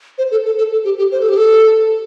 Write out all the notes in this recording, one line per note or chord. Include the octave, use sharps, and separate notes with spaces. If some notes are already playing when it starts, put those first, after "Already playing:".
C5
A4
A4
A4
A4
G4
G4
C5
A4
G4
A4